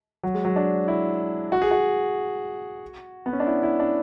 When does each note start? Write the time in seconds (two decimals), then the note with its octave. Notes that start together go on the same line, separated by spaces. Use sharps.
0.23 F#3
0.34 G#3
0.45 F#3
0.56 D4
0.88 E4
1.52 F#4
1.62 G#4
1.71 F#4
3.26 B3
3.33 C#4
3.40 D4
3.47 E4
3.63 E4
3.80 D4